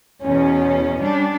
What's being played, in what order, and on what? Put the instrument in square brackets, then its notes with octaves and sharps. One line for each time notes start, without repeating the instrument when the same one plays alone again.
[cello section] E2 B2 [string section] C#4
[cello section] G3 D4